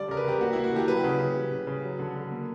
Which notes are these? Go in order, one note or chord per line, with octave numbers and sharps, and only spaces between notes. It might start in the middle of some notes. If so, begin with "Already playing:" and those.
Already playing: D3 G3 D5
C#3 A#4
B4
C#3 G4
A#3 F#4
A#3 E4
F#4
D3 G4
F#3 B4
C#3
C#3
G3
C#3
C#3
F#3
D3
D3
A#3